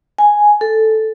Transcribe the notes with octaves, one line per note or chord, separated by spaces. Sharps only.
G#5
A4